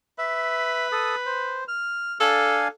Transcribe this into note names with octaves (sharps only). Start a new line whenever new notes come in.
B4 E5
A4 D#6
C5
F6
D4 A4 F5 G#5